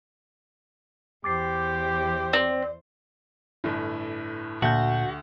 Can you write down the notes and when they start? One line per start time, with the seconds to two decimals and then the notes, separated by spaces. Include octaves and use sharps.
1.24 E2 G4 C5 D6 A6 C7
2.33 C4 D5
3.64 G1 A2
4.62 D2 A#2 F#4 A5 G6